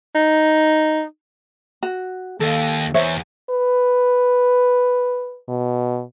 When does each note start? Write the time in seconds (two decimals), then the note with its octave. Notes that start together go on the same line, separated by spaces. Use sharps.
0.16 D#4
1.83 F#4
2.40 D#2 A4 F5
2.94 E2 C5 C#5 E5
3.50 B4
5.48 B2